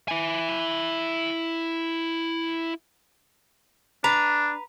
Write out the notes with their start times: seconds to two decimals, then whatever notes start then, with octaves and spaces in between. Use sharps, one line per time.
0.08 E4 G#5
4.04 D4 B4 A#5